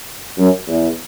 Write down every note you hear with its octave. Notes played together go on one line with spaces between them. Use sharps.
F#2
E2